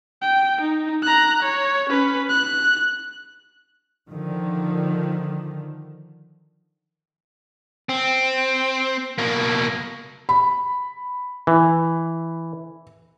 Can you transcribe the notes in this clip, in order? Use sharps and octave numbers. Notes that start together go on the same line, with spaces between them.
G5
D#4
A#5 F#6
C#5
C#4 B4
F#6
D3 D#3 F3
C4
B2 A#3
B5
E3